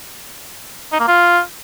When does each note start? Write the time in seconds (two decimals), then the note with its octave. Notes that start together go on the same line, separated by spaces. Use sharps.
0.92 D#4
1.00 A#3
1.08 F4